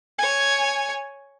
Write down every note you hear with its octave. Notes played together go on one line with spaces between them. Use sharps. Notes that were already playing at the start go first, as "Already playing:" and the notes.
C#5 G#5